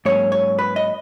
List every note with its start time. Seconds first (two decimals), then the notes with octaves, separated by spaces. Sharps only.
0.05 G#2 F#3 A#3 C#4 C#5
0.32 C#5
0.59 B4
0.76 D#5